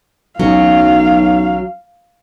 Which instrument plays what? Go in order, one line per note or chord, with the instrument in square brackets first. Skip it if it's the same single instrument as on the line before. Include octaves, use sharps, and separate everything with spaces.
[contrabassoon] B1 [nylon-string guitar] F#3 C#4 [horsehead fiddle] F5